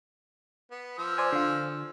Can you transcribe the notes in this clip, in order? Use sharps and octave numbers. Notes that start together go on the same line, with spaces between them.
B3
F3 E6
C5 D5 G#5
D3 F4